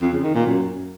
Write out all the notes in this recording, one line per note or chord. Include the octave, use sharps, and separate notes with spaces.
F2
C#3
D#3
A#2
F#2